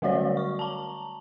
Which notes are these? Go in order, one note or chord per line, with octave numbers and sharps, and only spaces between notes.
D3 G3 A3 F#4 C#5 D5
C#6
A5 A#5